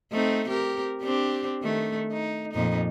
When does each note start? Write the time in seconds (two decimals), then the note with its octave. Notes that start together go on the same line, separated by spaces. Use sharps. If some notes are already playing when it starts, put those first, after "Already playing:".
0.12 A3 C4 D#4
0.49 C4 G4 A#4
1.02 C4 D4 G4
1.62 D#3 A3
2.12 D#4
2.53 F2 A#2 D#4